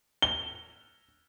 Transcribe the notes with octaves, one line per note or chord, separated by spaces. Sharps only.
G7